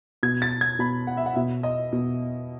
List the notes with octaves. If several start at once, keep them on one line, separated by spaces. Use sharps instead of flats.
B2 G#6
A6
G#6
B2 B5
F#5
E5
F#5
B2 E5
D#5
B2